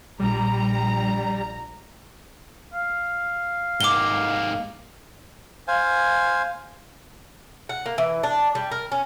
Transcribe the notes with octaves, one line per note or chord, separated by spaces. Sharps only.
A#1 G3 A#5
F5
G#2 A#3 D6 G7
C5 F5 G#5
F#5
A#3
E3
D4
G3
A#4
C#4